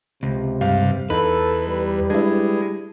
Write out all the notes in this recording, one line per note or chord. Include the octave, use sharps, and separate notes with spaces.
C#2 C3
G2 F5
E2 D#4 A4 B4
G3
G#3 D4 E4